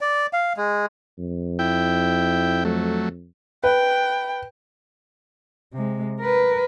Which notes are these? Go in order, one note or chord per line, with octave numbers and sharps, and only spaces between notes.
D5
F5
G#3
F2
E4 G5
F#3 A3
B4 G5
C3 G#3
A#4 B4